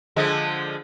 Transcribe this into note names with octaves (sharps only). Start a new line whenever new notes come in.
D3 F3 G#3